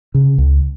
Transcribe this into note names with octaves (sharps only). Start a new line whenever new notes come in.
C#3
C#2